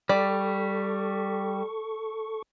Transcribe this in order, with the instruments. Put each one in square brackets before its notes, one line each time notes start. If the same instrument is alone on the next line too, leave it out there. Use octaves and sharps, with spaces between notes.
[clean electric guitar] G3 [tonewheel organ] A4 C#6 [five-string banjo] D5